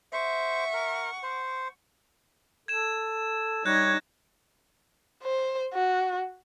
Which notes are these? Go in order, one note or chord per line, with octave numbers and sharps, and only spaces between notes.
C5 E5 F#5 C#6
A#4
C5
A4 G#6 E7
G3 D#4 C#5 F#6 G#6 A#6
C5
F#4